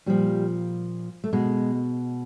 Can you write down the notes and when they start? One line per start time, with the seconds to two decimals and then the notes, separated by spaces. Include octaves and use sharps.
0.06 A#2 F3 G3
1.24 A3
1.33 B2 G#3